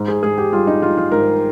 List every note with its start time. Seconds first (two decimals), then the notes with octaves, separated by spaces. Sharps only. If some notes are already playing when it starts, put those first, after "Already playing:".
Already playing: G#2
0.08 G#4
0.22 G#2 G#4
0.38 G4
0.53 G3 F4
0.67 D#4
0.82 G3 F4
0.97 F4
1.12 G#2 A#4